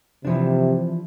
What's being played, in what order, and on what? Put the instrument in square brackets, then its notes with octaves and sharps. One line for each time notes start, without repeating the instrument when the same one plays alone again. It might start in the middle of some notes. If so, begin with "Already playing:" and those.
[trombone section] C3 [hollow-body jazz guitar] E3 F3 D4